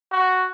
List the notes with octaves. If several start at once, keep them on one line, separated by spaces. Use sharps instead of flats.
F#4